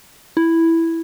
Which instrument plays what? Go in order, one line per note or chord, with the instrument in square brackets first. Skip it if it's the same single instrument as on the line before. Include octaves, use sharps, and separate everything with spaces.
[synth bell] E4